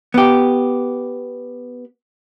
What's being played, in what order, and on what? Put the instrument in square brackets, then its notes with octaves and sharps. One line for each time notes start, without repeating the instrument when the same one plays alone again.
[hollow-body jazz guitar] B3 G4